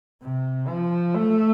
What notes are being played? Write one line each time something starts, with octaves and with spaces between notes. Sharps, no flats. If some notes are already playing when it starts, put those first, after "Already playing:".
C3
F3
A3